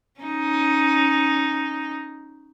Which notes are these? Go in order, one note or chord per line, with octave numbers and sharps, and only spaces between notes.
C#4 D#4